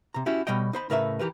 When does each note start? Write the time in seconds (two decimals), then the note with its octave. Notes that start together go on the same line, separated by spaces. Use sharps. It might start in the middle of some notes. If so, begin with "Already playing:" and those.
0.14 C3 A#5
0.26 C#4 E4 F#4 G4
0.47 B2 G3 C#5 D#5 G5
0.73 D#4 C5 B5
0.90 A2 C#3 A#4 B4 D#5 E5
1.19 E3 G4 A#4 B4